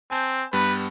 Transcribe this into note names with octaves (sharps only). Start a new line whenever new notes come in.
C4 G#5 A5 G6
G2 G3 B3 B4